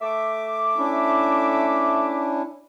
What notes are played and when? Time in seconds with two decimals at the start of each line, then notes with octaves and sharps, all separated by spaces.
0.02 A3 E5 D6
0.77 C#4 D4 E4